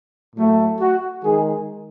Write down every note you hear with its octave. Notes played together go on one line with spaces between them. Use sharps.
A2 F#3 A3
F#4
D#3 G#3 G#4